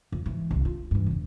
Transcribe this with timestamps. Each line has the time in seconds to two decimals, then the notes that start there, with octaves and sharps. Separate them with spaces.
0.12 F2
0.26 G#2 E3
0.51 C2 G2
0.65 F4
0.91 G2 E3
1.06 E1 A#2